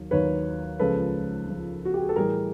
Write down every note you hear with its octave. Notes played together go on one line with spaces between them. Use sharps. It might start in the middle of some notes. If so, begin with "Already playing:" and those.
Already playing: D#2 D#3 F#3
D#2 D#3 F#3 B4 C#5
C#2 C#3 F3 A4 B4
C#2 C#3 F3
F#4
G4
G#4
A4
A2 E3 G3 G#4 A#4